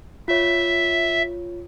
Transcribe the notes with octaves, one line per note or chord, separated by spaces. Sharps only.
F4 C#5 E5